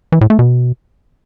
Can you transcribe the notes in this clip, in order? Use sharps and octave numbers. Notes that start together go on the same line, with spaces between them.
E3
A2
A3
B2